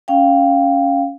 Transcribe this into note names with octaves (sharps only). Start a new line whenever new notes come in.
C#4 F5 G5